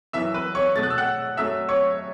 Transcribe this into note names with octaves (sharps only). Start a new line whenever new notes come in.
F#2 E3 B3 E5 E6
B4 B5
C#5 C#6
B2 A3 A6
F#6
E6
F#5 F#6
F#2 F#3 A3 E5 E6
C#5 C#6